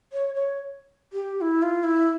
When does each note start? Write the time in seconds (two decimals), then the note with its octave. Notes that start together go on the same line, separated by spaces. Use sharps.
0.13 C#5
0.35 C#5
1.13 G4
1.41 E4
1.63 F4
1.84 E4